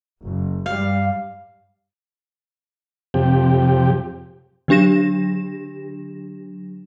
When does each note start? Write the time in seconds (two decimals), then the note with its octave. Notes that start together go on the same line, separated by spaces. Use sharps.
0.23 F#1
0.66 G2 G3 F5
3.14 F2 C3 G4
4.68 D3 F#3 D4 G4 A#6 E7